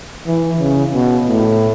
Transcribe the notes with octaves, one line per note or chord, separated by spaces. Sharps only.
E3
C#3
B2
A2